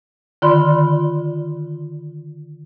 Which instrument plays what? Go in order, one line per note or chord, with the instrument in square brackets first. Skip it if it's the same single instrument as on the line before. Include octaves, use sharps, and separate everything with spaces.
[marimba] D3 D#3 F4 D5 B5 C6